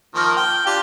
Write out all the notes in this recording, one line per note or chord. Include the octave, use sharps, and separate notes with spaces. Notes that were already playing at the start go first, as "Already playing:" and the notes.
D#3 F3 A#3
G5
D4 F4 G4